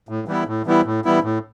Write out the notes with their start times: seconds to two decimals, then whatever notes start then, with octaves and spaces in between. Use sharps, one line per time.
0.09 A2
0.28 E3 G3 B3 E4
0.47 A2
0.66 E3 G3 B3 E4
0.85 A2
1.05 E3 G3 B3 E4
1.23 A2